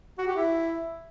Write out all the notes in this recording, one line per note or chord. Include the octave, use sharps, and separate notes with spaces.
F#4
G4
E4